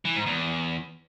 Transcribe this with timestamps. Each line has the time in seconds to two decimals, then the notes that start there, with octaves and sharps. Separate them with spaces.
0.05 E3
0.16 G#2
0.26 E2